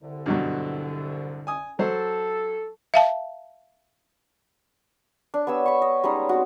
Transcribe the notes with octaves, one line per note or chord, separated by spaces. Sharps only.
C2 D3
G2 B2 F#3
G#5 D#6
F#3 A4 C5
E5 F5 A5
D4
B3 G4 C#5 E6
B5 C#6
D#5
G3 G#3 C#4 D#4
C4 F#4